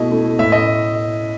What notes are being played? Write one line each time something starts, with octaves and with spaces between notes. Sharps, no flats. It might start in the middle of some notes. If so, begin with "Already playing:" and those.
Already playing: B2 A3 E4 D#5
A3 E4
A2 E5
D#5